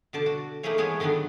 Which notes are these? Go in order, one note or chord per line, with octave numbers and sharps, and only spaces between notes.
B2 D3 D5 A5
F#4
A3 A#3 D#4 E4 G#4 C#5
E3 G#3 B3 G#4 C#5
D3 D#3 F#3 B3 D4